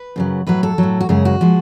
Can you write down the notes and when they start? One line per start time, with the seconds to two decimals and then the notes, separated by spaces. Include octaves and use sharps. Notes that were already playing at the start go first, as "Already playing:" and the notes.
Already playing: B4
0.16 F#2 C#3 F#3
0.47 A2 F#3 B4
0.63 A4
0.78 A2 F#3
1.01 F#4
1.09 F#2 C#3 G#3 G#4
1.25 F#4
1.41 F3 G#3